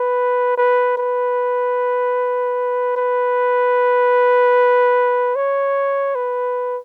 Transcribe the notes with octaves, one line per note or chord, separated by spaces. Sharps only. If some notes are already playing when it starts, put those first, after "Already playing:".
Already playing: B4
B4
B4
B4
C#5
B4